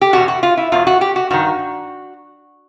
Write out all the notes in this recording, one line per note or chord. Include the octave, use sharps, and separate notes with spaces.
G4
E2 B2 F#4
F#4
F4
E4
E2 B2 F4
F#4
G4
F#4
G2 D#3 F#4